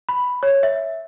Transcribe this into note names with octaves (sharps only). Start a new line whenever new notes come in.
B5
C#5
E5